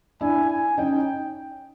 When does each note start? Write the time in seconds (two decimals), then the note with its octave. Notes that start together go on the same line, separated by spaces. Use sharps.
0.21 D4 E4 G#5
0.50 G#5
0.78 C#4 D#4 G5